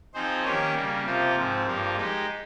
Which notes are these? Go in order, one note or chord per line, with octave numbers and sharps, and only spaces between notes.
F3 C4 D#4 G#4 C5
D#3 A#3 C#4 G4 C#5
C#3 G3 A#3
C3 F3 A#3 F4 C5
G#2 F3 C4
G2 F3 A#3 F4
G#3 D#4 G4